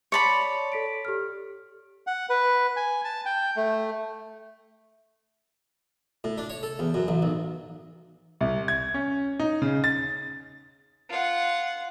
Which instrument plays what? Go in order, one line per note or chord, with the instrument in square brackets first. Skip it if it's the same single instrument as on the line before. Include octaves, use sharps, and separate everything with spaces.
[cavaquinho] C#5 D5 B5 [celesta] A5 C6
[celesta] A4 B6 D7
G4 A4 F6
[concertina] F#5
B4
G#5
A5
G5
A3
[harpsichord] A2
D4
C#5
A4
E2
F#2
A1
B1
[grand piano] C2
G#6
C#4
D#4
C#3
A6
[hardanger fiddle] F4 F#5